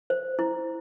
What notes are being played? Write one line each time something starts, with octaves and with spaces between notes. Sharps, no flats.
C5
E4